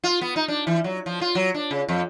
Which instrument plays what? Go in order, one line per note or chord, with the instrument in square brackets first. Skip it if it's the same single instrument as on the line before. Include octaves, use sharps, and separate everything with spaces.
[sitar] F4
B3
D#4
D4
E3
F#3
F3
F4
F#3
D4
C#3
F2